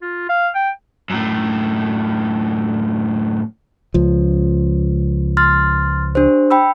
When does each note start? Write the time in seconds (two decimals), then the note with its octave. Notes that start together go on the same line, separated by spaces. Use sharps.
0.02 F4
0.29 F5
0.55 G5
1.10 F#2 A2
3.94 C#2 F3
5.37 C6 F6 A6
6.15 D4 G4 C5
6.50 G5 B5 E6